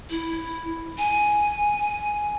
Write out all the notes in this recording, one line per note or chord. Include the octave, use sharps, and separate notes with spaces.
E4
G#5